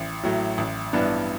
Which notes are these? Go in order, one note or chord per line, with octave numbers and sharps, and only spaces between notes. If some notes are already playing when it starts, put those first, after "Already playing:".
Already playing: A1
A2 F#3
A1
G2 E3 B3 D4